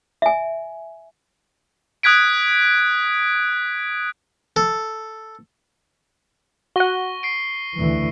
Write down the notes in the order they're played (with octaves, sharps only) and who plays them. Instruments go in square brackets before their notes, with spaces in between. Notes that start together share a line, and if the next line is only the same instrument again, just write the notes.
[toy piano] E5 G#5
[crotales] D#6 F#6 G#6 B6 D7
[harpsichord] A4
[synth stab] F#4 F#5 [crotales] C#6 A#6 G7
[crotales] C7 D7
[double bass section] D2 E3